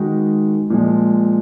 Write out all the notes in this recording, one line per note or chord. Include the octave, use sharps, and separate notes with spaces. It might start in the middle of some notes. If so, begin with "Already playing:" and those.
Already playing: D#3 G#3 D#4 F#4
A#2 F3 G#3